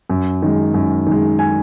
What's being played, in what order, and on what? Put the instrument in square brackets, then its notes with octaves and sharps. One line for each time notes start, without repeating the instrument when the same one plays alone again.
[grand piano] F#2
D#3 G#3
F#2
D#3
G#3
G#5